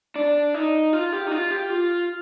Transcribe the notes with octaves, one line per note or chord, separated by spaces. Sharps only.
D4
D#4
F4
G4
D#4
F4
G4
F4